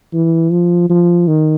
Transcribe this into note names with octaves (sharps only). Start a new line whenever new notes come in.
E3
F3
F3
D#3